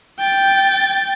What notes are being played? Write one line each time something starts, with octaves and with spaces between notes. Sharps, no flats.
G5 A6